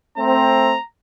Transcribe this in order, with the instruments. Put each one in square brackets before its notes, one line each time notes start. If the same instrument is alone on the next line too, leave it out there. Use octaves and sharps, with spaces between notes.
[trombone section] A3 C4 [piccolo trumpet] A#5